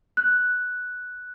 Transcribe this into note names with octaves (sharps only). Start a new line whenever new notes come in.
F#6